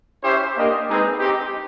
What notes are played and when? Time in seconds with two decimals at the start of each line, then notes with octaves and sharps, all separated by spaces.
0.23 C#4 E4 G4 C5 E5
0.56 A#3 D4 G4 A#4 D#5
0.87 G#3 C4 D#4 G#4 B4
1.19 C4 D#4 G4